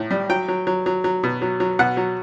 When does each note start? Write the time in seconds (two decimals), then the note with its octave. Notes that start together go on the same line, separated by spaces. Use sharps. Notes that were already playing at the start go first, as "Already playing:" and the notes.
Already playing: A2
0.11 G3
0.29 F#3 G5
0.48 F#3
0.67 F#3
0.86 F#3
1.04 F#3
1.24 B2
1.42 F#3
1.60 F#3
1.79 B2 F#5
1.97 F#3